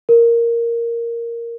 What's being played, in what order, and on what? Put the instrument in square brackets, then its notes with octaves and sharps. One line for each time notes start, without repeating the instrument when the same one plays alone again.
[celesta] A#4